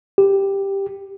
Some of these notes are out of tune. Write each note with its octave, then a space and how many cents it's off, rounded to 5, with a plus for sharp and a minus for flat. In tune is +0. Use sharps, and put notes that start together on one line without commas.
G4 +5